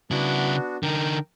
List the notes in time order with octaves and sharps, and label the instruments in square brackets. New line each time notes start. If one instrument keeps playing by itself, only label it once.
[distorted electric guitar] C#3 E4 [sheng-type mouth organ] B3 D4 F#4
[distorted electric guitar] D3 D#4 [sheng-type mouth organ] A#4 G5